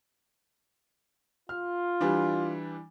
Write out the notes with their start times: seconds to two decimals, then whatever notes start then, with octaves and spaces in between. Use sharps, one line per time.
1.49 F4 F6
2.01 E3 G3 D4